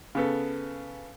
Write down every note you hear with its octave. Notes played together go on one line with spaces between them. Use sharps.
C#3 B3 A4